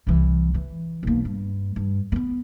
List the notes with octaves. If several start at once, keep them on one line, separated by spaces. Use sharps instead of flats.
C2 E3
E3
B1 A#3
G2
G2
A#3 B3